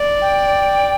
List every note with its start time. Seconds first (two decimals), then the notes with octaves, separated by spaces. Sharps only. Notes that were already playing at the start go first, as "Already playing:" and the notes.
Already playing: D5
0.21 G5